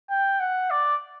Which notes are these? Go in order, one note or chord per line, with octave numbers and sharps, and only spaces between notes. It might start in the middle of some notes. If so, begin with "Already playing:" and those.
G5
F#5
D5